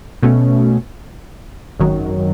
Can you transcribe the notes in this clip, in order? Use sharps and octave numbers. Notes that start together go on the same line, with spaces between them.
B2 A3 C#4
G#1 F#2 D#3 F#3